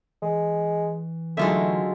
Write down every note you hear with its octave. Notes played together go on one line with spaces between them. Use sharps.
E3 G#3
D3 F#3 G#3 A3 D#4 F4 E5